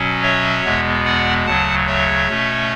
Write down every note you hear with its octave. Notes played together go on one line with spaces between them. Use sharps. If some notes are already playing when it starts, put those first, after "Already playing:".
Already playing: B2 F#3 C#4
C#5 E5
E2 B2 G#3 B3
D5 F#5
D2 C#3 F#3 F#5 A5
C#5 E5
B2 A3 C#4